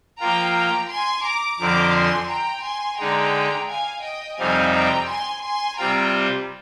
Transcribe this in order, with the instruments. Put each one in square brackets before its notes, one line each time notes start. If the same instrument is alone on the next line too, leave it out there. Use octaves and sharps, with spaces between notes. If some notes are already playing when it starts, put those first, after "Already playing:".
[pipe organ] F3 A#3 F4 [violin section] G5 A#5
[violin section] G5 A#5
G#5 C6
A#5 D6
[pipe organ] F2 D3 F3 C4 [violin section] A#5 D6
[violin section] G#5 C6
G5 A#5
G#5 C6
[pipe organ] D3 G#3 D#4 [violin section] G5 A#5
[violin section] F5 G#5
D#5 G5
[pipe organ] F2 C3 G3 C4 D#4 [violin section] F5 G#5
[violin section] G5 A#5
G#5 C6
G#5 C6
[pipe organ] C3 G3 C4 F4 [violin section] G5 A#5